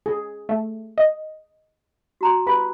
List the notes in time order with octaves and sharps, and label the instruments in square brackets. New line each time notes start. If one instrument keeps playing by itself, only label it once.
[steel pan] G#4
[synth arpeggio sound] A3
D#5
[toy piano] F#4 A#5 C6
[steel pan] G4 B4 B5